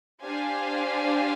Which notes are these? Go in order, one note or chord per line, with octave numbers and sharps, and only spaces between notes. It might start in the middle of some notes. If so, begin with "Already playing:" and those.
D4 G4 C5 F5 G#5